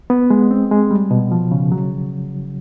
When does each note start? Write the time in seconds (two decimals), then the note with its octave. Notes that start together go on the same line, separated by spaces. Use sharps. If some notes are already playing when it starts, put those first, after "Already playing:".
0.10 B3
0.30 G#3
0.51 C4
0.71 G#3
0.91 G3
1.11 B2
1.32 F3
1.52 C#3
1.72 F#3